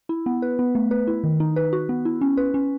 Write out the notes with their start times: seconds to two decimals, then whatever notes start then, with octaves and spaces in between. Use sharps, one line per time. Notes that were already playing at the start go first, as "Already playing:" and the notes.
0.09 E4
0.26 B3
0.42 B4
0.59 B3
0.75 A3
0.91 B4
1.07 E4
1.24 D#3
1.40 D#4
1.56 B4
1.73 F#4
1.89 B3
2.05 E4
2.21 C#4
2.37 B4
2.54 C#4